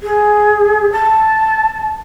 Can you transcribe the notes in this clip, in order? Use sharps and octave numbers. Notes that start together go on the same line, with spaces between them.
G#4
A5